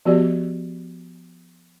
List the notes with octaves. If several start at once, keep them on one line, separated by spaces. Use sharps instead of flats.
F3 B3 F#4 G4 D5